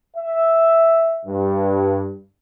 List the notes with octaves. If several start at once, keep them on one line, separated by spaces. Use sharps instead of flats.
E5
G2